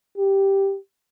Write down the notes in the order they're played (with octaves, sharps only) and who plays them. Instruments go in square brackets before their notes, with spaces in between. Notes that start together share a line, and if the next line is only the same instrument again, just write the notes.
[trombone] G4